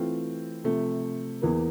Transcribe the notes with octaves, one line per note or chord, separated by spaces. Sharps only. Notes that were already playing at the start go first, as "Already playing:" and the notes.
Already playing: E3 A3 C4 F4
C3 F3 A3
E2 E3 A#3